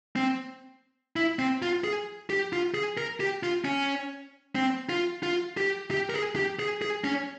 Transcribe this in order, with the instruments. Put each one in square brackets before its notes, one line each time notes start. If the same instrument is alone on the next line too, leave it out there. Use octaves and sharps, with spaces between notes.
[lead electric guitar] C4
E4
C4
F4
G#4
G4
F4
G#4
A#4
G4
F4
C#4
C4
F4
F4
G4
G4
A#4
G#4
G4
G#4
G#4
C#4